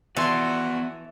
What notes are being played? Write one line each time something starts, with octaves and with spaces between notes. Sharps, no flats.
E3 B3 E4 F#4 A4 D5 G#5 C6